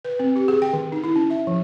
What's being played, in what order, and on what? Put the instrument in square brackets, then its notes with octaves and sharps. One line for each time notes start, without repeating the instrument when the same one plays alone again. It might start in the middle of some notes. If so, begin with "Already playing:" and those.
[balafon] B4
C4
G4
G#4
G5
D#3
D#4
E4
C#4
E5
F3